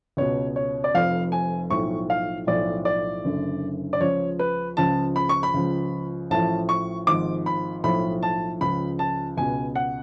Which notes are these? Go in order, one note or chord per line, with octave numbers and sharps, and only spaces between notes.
C#2 B2 C#5
C#5
D5
F1 F2 F3 F5
G#5
B1 A2 F3 C#6
F5
B1 A2 F3 D5
D5
F#1 F#2 D3
D5
C#2 C#3 F3 C#5
B4
C#2 C#3 F3 A5
B5
C#6
B5
C#2 C#3 F3
A1 A2 F3 A5
C#6
G#1 G#2 F3 D6
B5
B1 A2 F3 B5
A5
C#2 C#3 F3 B5
A5
C#2 B2 G#5
F#5